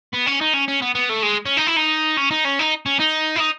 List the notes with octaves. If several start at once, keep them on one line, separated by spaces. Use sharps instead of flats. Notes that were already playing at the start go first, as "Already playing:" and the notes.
B3
C#4
D#4
C#4
C#4
B3
B3
A3
G#3
C#4
D#4
E4
D#4
C#4
D#4
C#4
D#4
C#4
D#4
E4
D#4